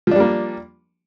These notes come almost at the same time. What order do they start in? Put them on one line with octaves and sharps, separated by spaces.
F3 D4 G3 A#3